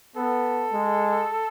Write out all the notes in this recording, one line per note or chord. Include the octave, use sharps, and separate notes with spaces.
B3 A4
G#3